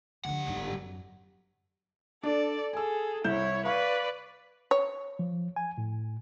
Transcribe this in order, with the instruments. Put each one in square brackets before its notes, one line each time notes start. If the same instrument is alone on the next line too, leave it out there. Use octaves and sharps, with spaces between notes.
[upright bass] D3 F3 [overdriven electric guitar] G3 F#5
[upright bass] G1 G#2
F#2
[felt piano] D4 [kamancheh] A4 D5
[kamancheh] G#4 A4 [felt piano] G#5 E6
[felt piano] C2 G6 E7 [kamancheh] E4 C#5
[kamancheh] B4 D5 [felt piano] F5 C#6
[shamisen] C#5
[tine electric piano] F3
G#5
A2